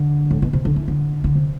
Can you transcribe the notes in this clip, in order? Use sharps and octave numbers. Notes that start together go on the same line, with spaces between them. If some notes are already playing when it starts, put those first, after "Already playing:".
Already playing: D3
A2
B2
C3
D3
E3
D3
D3
C3